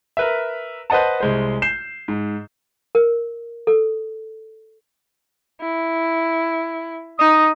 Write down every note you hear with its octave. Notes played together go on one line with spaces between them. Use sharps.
A#4 B4 E5
B4 C5 D#5 F#5 A5
C2 G#3 C5
G6 C7 E7
G#2
A#4
A4
E4
D#4 D#6